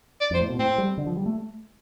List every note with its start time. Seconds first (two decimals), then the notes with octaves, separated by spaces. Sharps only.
0.21 D5
0.31 F2 C5
0.40 A2
0.50 B2
0.59 A2 C4
0.78 G3
0.98 D3
1.07 F3
1.17 G3
1.26 A3